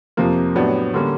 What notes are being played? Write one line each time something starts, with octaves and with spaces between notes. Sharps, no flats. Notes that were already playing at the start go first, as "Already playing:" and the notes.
F2 C3 F3 A#3
A2 F#3 B3 D4 G4
D3 G3 A#3 C#4